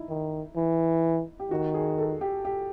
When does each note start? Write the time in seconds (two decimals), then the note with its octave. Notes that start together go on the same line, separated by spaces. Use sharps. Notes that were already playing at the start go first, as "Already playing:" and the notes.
Already playing: D#4 E4
0.09 D#3
0.56 E3
1.40 G4
1.51 D#3 F#4
1.74 G#4
1.98 A4
2.21 G4
2.45 G4